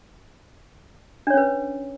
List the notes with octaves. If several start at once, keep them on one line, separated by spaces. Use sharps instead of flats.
C#4 D4 B4 C#5